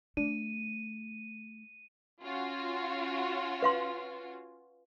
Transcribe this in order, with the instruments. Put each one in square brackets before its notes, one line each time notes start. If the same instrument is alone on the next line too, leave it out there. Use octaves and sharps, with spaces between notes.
[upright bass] A3 [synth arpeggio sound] D4 [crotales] D#7
[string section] C#4 F4 F#4
[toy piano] B4 F5 C6